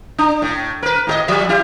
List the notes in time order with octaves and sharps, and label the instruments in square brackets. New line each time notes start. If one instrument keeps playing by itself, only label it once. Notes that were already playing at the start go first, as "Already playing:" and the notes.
[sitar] D4
A2
A#4 B4
A2 G4 D#5
F3 G3 E5
E4 G4